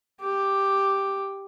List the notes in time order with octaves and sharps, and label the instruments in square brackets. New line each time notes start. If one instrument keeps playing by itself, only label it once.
[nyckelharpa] G4